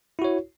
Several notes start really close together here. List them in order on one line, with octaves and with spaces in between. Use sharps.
E4 F#4 C#5